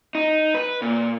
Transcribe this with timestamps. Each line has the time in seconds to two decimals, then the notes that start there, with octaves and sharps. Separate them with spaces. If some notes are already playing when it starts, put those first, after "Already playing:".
0.15 D#4
0.54 B4
0.82 A#2